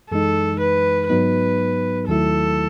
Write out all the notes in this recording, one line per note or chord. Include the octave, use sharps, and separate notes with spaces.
F#2 E3 G#3 D#4 A4
B4
G#2 F#3 B3 D#4 B4
D#2 D#3 F#3 A3 E4 A4